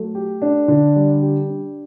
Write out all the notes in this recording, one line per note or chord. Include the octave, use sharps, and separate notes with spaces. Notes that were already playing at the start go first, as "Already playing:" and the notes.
Already playing: F#3 A3
G4
D4
D3
G3
G4
D4